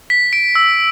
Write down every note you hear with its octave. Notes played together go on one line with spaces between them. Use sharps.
B6
D7
E6